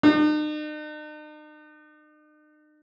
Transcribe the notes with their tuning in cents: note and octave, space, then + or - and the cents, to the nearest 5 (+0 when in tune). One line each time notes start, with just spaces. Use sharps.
D#4 -45